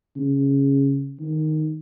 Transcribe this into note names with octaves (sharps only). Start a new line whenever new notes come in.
C#3
D#3